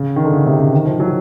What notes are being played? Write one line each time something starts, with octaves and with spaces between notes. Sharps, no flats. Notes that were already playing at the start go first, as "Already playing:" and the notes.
Already playing: C#3
D#3
D3
C#3
C3
C#3
D#3
F3
F#3